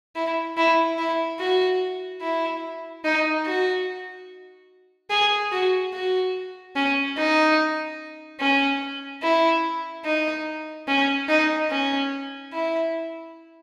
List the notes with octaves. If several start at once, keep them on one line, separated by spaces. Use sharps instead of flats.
E4
E4
E4
F#4
E4
D#4
F#4
G#4
F#4
F#4
C#4
D#4
C#4
E4
D#4
C#4
D#4
C#4
E4